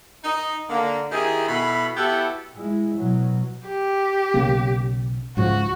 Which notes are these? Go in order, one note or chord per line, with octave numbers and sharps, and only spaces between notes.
D#4
D3 A#3
D#3 D#4 E4 G4 G#4
B2 E4 A4 B5
B3 E4 F#4 G4 A4
G#3 E4
B2 F#3
G4
B1 C#3 A#3
C#2 G#2 F3 F#4